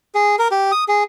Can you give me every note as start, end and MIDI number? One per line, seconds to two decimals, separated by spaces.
0.15 0.36 68
0.39 0.48 70
0.51 0.71 67
0.72 0.84 87
0.88 1.04 68